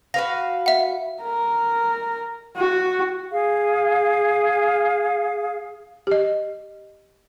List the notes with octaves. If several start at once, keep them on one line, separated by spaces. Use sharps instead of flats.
F#4 B4 F5 A#6
E5 F#5
A#4
F#4
G#4 F5
G4 D#5